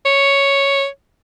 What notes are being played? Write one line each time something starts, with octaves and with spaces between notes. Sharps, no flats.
C#5